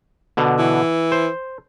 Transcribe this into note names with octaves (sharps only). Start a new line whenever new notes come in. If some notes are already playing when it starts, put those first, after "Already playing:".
B2 D3
E3
C5